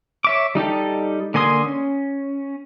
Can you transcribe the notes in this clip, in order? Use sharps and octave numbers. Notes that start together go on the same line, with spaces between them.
C#5 E5 D6
G3 D#4 G4 A4
D3 A#3 G#5 C6 D#6
C#4